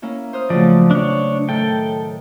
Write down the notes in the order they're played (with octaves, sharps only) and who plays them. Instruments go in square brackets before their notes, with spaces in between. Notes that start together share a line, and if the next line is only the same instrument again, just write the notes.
[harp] A#3 C#4 E4
C5 D#6 F6
[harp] C#3 F#3 A3 [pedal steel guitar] F3 D5
[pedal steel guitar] D4 C#5
[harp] A2 D#3 [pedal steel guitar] A4 G5